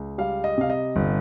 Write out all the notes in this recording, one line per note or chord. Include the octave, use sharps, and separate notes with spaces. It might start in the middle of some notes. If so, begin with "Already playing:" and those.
Already playing: C#2
G3 F5
D#5
C3 F5
D#5
G1